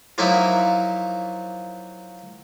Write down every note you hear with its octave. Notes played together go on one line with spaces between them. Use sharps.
F3 F#3 A#3 D#4 E4